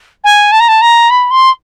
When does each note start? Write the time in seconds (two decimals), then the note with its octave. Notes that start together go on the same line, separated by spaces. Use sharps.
0.24 G#5
0.52 A5
0.60 A#5
0.68 A5
0.81 A#5
1.10 B5
1.31 C6